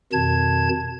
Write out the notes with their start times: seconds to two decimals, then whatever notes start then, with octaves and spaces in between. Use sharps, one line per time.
0.12 F2 B2 D#3 A5 G#6